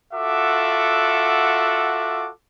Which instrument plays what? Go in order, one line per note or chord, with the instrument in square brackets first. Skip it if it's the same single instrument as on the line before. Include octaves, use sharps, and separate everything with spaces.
[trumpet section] F4 F#4 A4 E5 F#5 D6